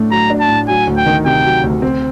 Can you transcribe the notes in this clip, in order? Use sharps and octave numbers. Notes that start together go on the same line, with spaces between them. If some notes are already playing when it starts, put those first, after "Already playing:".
Already playing: A2 A3 D4
F#3 A#5
D4
A5
A2
F#3 G#5
D2
G5
D#3
C3 G5
F#3
D2
C4